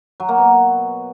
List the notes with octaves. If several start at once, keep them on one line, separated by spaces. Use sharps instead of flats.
F#3
A#3
B2